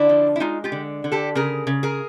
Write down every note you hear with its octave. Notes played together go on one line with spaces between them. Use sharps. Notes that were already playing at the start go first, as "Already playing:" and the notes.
Already playing: D3 D4 E4
F3
E4
G#3 D#4 F4
F4 G4
D3
D3
G4 A4
C#3 G#4 A#4
C#3
G#4 A#4